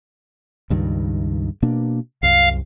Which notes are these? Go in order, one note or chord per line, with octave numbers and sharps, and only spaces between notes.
C#2 G2 D#3
B2 A#3 D4
C2 F#2 F5